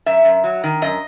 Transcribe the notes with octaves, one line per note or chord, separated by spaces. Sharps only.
F#2 E5
F#2
F#3
D#3
F#2 D#5